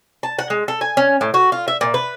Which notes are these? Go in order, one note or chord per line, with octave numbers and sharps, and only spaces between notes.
A5
F#5
G#3
A4
G#5
C#4
A2
F#4
F4
E5
A#2
B4